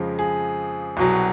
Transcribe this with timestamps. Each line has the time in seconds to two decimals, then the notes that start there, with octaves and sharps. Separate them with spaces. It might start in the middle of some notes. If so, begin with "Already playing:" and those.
Already playing: F2 C#3 F3 G#3
0.19 G#4
0.97 C2 B2 F#3